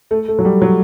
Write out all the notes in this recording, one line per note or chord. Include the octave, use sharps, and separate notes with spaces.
A3
A3
F#3
G3
F#3